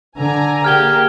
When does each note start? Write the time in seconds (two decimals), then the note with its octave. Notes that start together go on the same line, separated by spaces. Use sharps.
0.17 D3 D5 G#5 A#5
0.65 A#3 G4 G#4 F6 G#6 G7